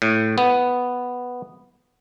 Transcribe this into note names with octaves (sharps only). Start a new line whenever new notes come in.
A2
B3